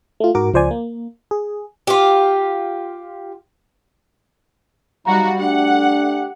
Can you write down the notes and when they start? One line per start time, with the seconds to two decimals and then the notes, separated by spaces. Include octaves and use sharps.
0.20 A3 F4
0.35 G#2 F#4 A#4 D6
0.54 C#2 F3 C5 D5 G#5
0.71 A#3
1.31 G#4
1.87 F4 G4
5.06 F#3 G3 D#4 F#4 F5 F#5 A#5
5.39 A3 D4 G4 F#5